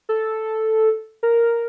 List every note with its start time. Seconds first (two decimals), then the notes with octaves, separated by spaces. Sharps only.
0.09 A4
1.23 A#4